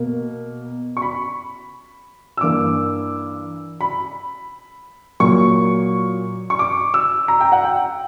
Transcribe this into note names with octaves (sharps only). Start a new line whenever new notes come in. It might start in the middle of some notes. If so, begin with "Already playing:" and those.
Already playing: B2 A#3
C#6
B5
E6
G2 E3 A#3 D6
B5
A#2 F#3 A#3 C#6
C#6
D6
E6
A#5
G5
F#5
G5